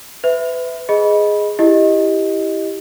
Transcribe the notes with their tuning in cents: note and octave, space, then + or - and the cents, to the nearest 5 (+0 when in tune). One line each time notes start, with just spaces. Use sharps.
B4 +30 E5 +0
G#4 +0 D#5 +0 B5 -15
E4 +0 G4 +0 D#5 +0